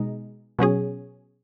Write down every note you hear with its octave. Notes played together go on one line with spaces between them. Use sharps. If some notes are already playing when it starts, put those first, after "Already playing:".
Already playing: B2 G#3 D#4
B2 F#3 C#4 G#4